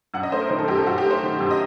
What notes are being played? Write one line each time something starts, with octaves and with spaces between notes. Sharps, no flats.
F#2 F#5
D#5
A3 C5
A#4
D#3 C5
A4
F#2 G4
A4
F#2 F#4
G4
A3
C5
D#3
F#2
D#5